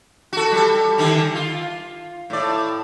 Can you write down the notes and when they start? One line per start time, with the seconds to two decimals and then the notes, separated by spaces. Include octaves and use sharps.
0.33 F#4 A4
0.52 G3 A4
0.98 D3 D#3 G3
1.35 F4
2.30 A2 D5